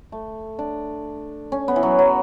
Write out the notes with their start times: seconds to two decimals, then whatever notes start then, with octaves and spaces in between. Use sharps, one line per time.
0.12 A3
0.59 D4
1.52 C#4
1.68 B3
1.76 E3
1.83 F#3
1.99 F#3